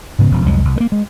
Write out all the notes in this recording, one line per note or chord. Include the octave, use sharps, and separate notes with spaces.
G#2 C#3 B3
E1 C#3 F3
C2 F2 F#3 G#3
C2
G#3 A#3
G#3